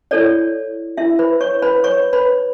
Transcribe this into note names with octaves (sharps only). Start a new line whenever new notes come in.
E4 A4 C#5 D5
E4 E5
B4 B5
C#5 C#6
B4 B5
C#5 C#6
B4 B5